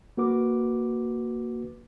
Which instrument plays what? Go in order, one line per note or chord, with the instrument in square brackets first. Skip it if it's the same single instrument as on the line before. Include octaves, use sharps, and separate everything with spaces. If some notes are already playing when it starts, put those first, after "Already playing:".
[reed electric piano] A#3 F#4 B4 D6